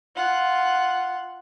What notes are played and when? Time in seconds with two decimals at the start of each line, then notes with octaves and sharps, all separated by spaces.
0.15 F4 F#5